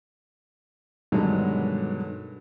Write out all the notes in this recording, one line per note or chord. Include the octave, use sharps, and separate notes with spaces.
G2 B2 D3 D#3 F#3 G#3